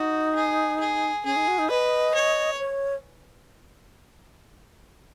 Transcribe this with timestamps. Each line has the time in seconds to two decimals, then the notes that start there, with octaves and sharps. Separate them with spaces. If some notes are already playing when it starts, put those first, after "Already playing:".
Already playing: D#4 F#4
0.36 G#4
0.80 G#4
1.25 C#4 G#4
1.36 D#4
1.48 F#4
1.59 D#4
1.70 B4 D#5
2.15 C#5
2.60 C#5